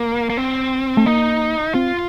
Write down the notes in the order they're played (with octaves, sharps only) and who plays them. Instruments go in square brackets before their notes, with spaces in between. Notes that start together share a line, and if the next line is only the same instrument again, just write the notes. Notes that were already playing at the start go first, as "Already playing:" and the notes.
Already playing: [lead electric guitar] A#3
A#3
C4
[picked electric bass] A3
[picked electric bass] A#3 [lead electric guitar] D#4
[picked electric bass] C4 [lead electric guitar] F4